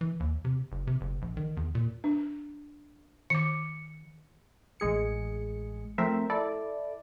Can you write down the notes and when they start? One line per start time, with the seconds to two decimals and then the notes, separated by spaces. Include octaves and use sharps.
0.01 E3
0.20 D#2
0.45 C3
0.72 F#1
0.87 C3
1.01 F#1
1.22 A#1
1.37 D#3
1.57 E2
1.75 A#2
2.04 D4
3.30 D#3 D6 C#7
4.80 A1 G#3 G#4 C#7
5.98 F3 A3 C4 A#4 C5 E5
6.30 E4 A4 D5